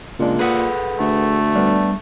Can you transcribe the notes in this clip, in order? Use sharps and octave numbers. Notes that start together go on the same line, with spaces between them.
A#2 C#3 G#3 D4
G#4 A4 B4 F#5 B5 D#6
D2 A3
G3 B3 D4